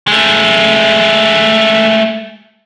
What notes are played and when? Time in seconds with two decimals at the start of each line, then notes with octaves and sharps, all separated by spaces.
0.08 G#3 A3